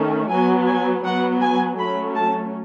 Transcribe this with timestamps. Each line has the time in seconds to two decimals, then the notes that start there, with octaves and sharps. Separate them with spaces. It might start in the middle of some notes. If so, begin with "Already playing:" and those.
Already playing: D#3 A3 C#4
0.29 F#3 B3 G#5
0.66 G#5
1.03 F#3 B3 F#5
1.41 G#5
1.78 F#3 A3 C#4 B5
2.15 A5